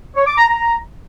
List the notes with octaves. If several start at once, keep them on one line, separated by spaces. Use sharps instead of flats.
C#5
D6
A#5
A#5